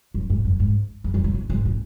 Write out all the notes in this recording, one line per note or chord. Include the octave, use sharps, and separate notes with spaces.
F#2
G#2
F#2
G#2
E2
F#2
G#2
G#2
G#2
A2